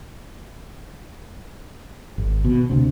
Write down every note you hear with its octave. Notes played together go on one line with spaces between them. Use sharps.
G#1
B2
D2 C3 C4